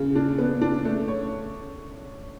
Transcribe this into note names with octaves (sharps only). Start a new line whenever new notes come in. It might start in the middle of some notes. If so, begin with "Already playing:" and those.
Already playing: C#3
D4
B3
D4
A3
C#5